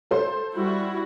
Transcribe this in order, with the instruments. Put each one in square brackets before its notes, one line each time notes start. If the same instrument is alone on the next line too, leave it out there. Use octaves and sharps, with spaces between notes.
[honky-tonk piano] A4 C5 C6
[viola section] G3 E4 F#4